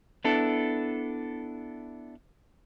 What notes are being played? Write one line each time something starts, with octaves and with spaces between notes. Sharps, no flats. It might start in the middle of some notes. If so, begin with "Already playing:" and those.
B3 D4 E4 A4